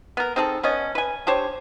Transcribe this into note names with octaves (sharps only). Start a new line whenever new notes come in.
B3 A#4
C4 D#4 G#4 A4
B3 C#4 D#5
B4 G#5
D4 G4 C5 C#5